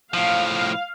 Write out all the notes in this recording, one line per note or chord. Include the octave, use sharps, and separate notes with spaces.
A2 F3 F5